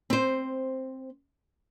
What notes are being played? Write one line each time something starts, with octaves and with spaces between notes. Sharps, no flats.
C4 C5